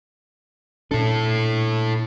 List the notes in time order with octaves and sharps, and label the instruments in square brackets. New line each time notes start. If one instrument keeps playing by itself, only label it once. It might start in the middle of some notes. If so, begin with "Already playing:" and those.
[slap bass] A#2 D4 [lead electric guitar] E4 A4